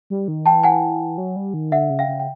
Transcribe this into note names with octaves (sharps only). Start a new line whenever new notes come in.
G3
D#3
E3 G5 A5
F#5 G#5
F#3
G3
D#3
D3 E5 F#5
C#3
F5 G5
C#3
G5